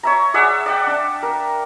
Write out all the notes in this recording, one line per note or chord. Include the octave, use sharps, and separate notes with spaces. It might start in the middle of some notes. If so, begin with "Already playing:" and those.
C#5 E5 A#5
G#4 D5 E5 F#5
D5 E5 F#5 G5
D4
A#4